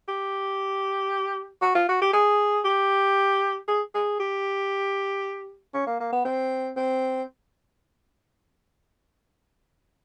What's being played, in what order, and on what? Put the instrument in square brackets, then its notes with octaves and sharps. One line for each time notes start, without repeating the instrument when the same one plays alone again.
[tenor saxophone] G4
F#4
F4
F#4
G4
G#4
G4
G#4
G#4
G4
C#4
A#3
A#3
B3
C4
C4